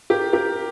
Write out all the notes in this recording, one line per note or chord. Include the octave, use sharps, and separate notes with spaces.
G4 A#4
G4 A#4